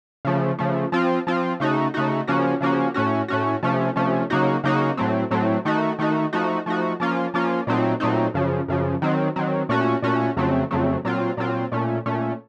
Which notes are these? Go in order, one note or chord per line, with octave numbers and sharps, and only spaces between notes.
C#3 F3 A3
C#3 F3 A3
F3 C4 F4
F3 C4 F4
C#3 A3 D#4 F#4
C#3 A3 D#4 F#4
C#3 F3 A#3 C#4 F#4
C#3 F3 A#3 C#4 F#4
A2 A3 C#4 F#4
A2 A3 C#4 F#4
C3 F3 A3 C#4
C3 F3 A3 C#4
C#3 F#3 A#3 D#4 F#4
C#3 F#3 A#3 D#4 F#4
A2 F#3 A3 C4
A2 F#3 A3 C4
D#3 A3 D#4 F#4
D#3 A3 D#4 F#4
F3 A3 D#4 F#4
F3 A3 D#4 F#4
F3 A#3 C#4 F4
F3 A#3 C#4 F4
A#2 F#3 A3 C4 D#4
A#2 F#3 A3 C4 D#4
F#2 C#3 F3
F#2 C#3 F3
D#3 F#3 C4
D#3 F#3 C4
A#2 A3 C#4 F#4
A#2 A3 C#4 F#4
F2 C#3 F#3 A3 C4
F2 C#3 F#3 A3 C4
A#2 F#3 C4 F4
A#2 F#3 C4 F4
A#2 A3 C#4
A#2 A3 C#4